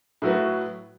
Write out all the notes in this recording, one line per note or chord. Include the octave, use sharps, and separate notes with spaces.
A2 F#3 A3 F#4 B4